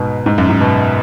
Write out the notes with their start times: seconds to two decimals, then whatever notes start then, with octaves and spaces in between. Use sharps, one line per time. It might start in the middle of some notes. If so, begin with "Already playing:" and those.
Already playing: G#2 B2
0.26 G#2
0.38 F#2
0.49 G#2
0.61 B2